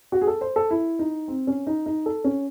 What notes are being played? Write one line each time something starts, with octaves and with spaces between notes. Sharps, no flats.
F#4
G#4
A4
C5
A4
E4
D#4
C4
C#4
D#4
D#4
A4
C#4